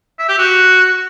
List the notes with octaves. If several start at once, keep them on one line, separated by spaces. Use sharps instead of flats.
E5
G4
F#4